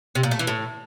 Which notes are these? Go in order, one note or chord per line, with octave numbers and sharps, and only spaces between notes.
C3
A#2
A3
E3
A2